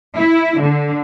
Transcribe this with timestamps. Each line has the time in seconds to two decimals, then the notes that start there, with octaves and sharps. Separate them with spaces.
0.16 E4
0.63 D3